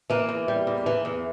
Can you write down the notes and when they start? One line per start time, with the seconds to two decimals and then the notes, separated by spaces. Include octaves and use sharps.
0.10 E3 A#3
0.29 E2
0.48 G3
0.67 E2
0.86 E3
1.05 E2